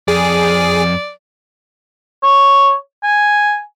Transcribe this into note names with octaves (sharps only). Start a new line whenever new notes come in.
F2 G#4 D5
C#5
G#5